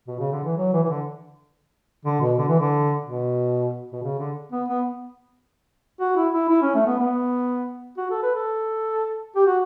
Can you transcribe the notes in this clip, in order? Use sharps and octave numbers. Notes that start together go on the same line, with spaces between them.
B2
C#3
D3
E3
F#3
E3
E3
D3
D3
B2
D3
E3
D3
B2
B2
C#3
D3
B3
B3
F#4
E4
E4
E4
C#4
A3
B3
B3
F#4
A4
B4
A4
G4
F#4